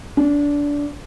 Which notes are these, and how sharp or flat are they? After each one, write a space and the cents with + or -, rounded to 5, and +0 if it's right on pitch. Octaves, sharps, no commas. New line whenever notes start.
D4 -20